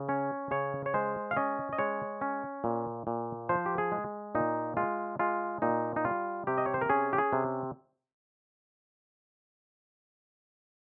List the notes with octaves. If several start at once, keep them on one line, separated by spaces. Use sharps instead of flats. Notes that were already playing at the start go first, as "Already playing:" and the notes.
Already playing: C#3
C#4 C#5
C#3 C#5
C#5
G#3 C5
F5
C#4 D#5
D#5
G#3 C#5
C#4
A#2
A#2
F3 C5
G4
G#4
G#3
A#2 D#4
G#3 F4
G#3 F4
A#2 D#4
D#4
G3 F4
C3 G4
D#5
C#5
C5
A#4
C#4 G#4
G4
G#4
C3